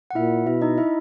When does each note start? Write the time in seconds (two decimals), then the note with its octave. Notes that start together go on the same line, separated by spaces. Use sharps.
0.10 F#5
0.15 A#2 E4 E5
0.46 B2 E4 E5
0.62 D#4 D#5
0.78 E4 E5